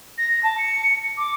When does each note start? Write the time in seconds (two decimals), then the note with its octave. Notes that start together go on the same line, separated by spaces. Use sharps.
0.18 A#6
0.43 A5
0.58 C#7
1.17 D6